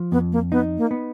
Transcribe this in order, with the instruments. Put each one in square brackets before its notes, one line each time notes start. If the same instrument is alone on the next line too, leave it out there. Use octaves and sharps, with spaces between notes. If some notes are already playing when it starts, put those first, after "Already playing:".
Already playing: [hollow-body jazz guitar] F3
[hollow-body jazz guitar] F2 [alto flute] B3
[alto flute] A#3
[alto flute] B3 [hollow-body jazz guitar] D#4
[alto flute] A#3
[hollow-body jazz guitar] B3